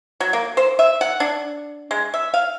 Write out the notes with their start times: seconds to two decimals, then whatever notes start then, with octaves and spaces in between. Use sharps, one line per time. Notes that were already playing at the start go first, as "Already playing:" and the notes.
0.20 F#3
0.33 A#3
0.57 C5
0.79 E5
1.01 F#5
1.20 D4
1.91 G#3
2.14 E5
2.34 F5